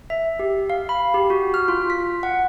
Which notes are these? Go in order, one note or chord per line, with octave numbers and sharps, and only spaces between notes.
E5
G4
F5
B5
G4
F#4
F6
F4
B6
F#5